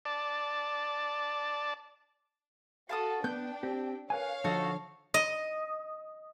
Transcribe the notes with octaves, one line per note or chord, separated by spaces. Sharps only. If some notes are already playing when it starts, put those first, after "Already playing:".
D5 A5
F#4 A4 F5 A5 D#6
B3 D4 G5 G6
C4 G4
A#4 B4 C#5 F5 G#5
D3 F3 D#4 F#4 A4
D#5